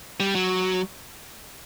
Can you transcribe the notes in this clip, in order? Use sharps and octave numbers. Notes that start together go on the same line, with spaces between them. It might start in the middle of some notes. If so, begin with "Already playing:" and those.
G3
F#3